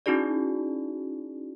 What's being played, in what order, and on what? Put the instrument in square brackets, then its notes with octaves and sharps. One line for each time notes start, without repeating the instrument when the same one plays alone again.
[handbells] C#4 D#4 E4 F#4 G#4 D5